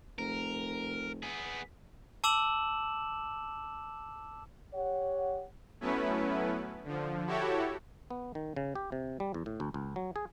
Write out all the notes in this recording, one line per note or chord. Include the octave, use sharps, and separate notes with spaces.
F1 A#4
B3 G#4
A5 D6 E6 E7 F#7
G4 C#5 F#5
F#3 A3 B3 C#4 E4 B4
D3 F3
E4 F#4 G4 A4 C#5
B3
D#3
C#3
G4
C3
G3
E2
A2
D2
C#2
F#3
G#4